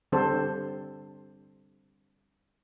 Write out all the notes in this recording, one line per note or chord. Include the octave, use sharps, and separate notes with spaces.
D3 G3 C4 D4 A4 C5